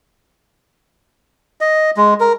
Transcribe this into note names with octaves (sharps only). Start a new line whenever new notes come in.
D#5
G#3
A#4